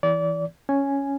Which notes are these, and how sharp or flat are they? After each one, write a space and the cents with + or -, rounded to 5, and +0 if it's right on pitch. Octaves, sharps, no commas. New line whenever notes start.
E3 +0 D5 -30
C#4 +0 G#5 +0